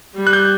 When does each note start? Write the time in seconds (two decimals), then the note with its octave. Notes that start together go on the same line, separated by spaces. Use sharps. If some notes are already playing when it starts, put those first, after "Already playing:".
0.17 G3
0.27 F#6
0.33 G6